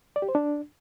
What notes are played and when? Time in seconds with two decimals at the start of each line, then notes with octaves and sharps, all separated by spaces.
0.16 D5
0.22 G4
0.29 C5
0.35 D4